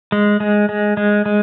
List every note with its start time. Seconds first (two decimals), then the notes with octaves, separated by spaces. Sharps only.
0.12 G#3
0.40 G#3
0.69 G#3
0.97 G#3
1.26 G#3